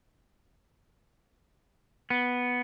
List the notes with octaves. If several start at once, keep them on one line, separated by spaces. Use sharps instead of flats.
B3